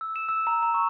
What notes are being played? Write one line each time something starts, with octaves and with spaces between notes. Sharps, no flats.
E6
E7
E6
A#5
A#5
C#6